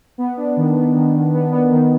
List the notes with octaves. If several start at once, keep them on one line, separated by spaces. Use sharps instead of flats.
B3
D4
D#3
B3
D#3
D#3
B3
B3
D#3